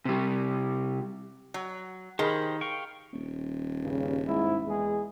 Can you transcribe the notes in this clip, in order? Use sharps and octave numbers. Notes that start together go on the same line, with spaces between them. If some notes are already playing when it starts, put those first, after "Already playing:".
C3 G3
F#3
D#3 G4 G#4 A#4 C5 B5
F5 G5 C#6
D#1
G2 C#3
G#2 E4
E2 G#3 G#4